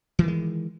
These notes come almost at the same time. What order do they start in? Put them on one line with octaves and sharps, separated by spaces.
E3 D#3 G#3